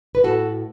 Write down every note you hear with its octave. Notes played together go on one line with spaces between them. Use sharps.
B4
A2 F#4 A4